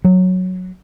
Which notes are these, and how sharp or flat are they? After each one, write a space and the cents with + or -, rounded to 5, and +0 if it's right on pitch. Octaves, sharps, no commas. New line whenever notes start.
F#3 -5